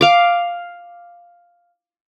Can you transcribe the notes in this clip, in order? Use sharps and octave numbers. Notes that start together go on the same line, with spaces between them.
F5 D6